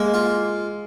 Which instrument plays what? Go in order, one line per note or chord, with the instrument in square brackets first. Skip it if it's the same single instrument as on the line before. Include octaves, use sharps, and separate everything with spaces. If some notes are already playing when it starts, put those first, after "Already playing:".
Already playing: [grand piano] G#3 [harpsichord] A#3
[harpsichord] F4